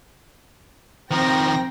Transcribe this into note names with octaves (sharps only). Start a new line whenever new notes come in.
D#3 F3 C4 G5 A#6